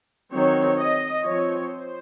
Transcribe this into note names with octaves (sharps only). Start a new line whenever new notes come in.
D#3 F#3 C4 C#5
D#5
F3 C4 C#5
C5